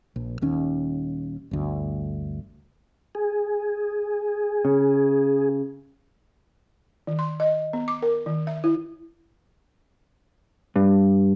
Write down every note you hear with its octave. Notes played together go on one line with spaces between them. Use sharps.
A#1
D#1 D#2 C#4
G1 D2
G#4
C#3
D#3
C6
D#5
B3
D6
A#4
D#3
E5
E4
G2